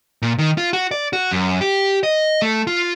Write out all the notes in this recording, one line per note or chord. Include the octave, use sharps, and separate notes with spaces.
A#2
D#3
F4
F#4
D5
F#4
F#2
G4
D#5
A3
F4